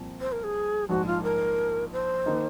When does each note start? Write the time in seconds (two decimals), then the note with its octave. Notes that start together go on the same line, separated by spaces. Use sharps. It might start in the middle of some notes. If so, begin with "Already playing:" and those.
Already playing: C2 A#2 F3 C4
0.20 C5
0.32 A#4
0.44 G#4
0.89 A#1 G#2 F3 F#4
1.06 F4
1.23 A#4
1.92 C5
2.26 D#3 A#3 D#4